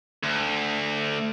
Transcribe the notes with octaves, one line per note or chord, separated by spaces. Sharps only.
D2